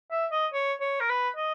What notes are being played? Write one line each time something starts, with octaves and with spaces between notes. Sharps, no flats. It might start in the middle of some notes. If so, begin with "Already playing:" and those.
E5
D#5
C#5
C#5
A#4
B4
D#5